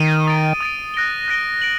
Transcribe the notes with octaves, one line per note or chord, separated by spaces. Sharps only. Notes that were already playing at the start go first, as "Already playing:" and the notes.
Already playing: D#3 D#7 G7
D#6 A6 D7
D#6 A6 D7
F#6 A#6 D7 G7
F#6 A#6 D7 G7
D7 F#7